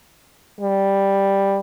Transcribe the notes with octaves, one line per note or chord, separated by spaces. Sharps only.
G3